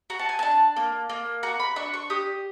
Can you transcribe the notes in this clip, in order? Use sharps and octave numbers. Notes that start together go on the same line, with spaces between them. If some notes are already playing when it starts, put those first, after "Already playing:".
F#4 A#5
A5
G#5
D4 A5
A#3
A#3
F#4 A#5
B5
D4 C#6
C#6
G4 D#6